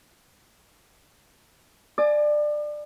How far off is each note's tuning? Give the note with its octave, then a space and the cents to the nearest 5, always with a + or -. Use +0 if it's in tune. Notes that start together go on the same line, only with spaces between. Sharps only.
D5 +20 G#5 +35 D6 +40